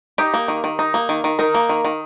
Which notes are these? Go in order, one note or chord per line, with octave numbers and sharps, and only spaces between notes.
D#4 G4
A#3
D#3
D#3
D#4
A#3
D#3
D#3
D#4 A#4
A#3
D#3
D#3